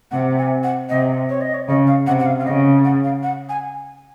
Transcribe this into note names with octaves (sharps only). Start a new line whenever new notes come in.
C3 F#5
G#5
F#5
C3 D#5
C#5
D#5
C#5
C#3 D#5
F5
C3 F#5
F#5
F5
F5
C#3 D#5
F#5
F5
F#5
G#5